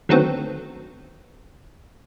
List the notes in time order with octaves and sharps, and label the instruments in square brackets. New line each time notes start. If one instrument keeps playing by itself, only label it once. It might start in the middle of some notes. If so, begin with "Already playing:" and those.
[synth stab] D3 D#3 F#3 A3 B3 C4